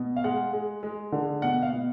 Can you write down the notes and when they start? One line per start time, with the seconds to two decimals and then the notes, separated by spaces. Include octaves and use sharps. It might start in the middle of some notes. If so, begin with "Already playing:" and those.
Already playing: B2
0.17 F5
0.24 G#3 F#5
0.53 G#3
0.83 G#3
1.12 D3
1.42 B2 F#5
1.63 F5
1.73 B2